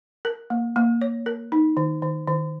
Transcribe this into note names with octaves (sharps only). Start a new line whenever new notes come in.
A#4
A#3
A#3
C#5
A#4
D#4
D#3
D#3
D#3